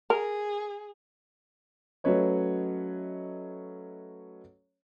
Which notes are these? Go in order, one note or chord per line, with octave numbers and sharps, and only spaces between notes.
G#4 A#4
F#3 A3 C#4 B4 C#5 D#5